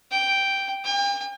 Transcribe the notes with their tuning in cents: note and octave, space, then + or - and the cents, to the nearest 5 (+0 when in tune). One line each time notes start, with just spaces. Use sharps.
G5 +0
G5 +40